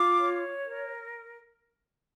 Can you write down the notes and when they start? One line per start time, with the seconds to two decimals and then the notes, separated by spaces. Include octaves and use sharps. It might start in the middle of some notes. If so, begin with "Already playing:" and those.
Already playing: F4 D6
0.18 C#5
0.65 A#4